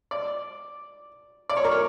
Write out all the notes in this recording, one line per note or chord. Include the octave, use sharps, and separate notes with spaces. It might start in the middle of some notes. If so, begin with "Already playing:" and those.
D5
D5
C#5
A#4
C#5